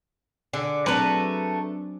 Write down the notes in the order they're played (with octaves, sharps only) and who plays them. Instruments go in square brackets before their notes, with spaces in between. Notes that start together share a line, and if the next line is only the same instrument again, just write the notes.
[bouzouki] D3 [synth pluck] G#4 D6
[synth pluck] F#3 C4 D4 [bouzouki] A3 B4 A#5